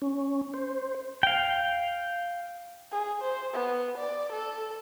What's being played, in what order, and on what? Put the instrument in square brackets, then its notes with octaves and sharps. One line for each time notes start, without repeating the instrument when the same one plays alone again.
[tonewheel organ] C#4
C5
[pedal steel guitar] F5 G5
[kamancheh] G#4
C5
B3
D5
A4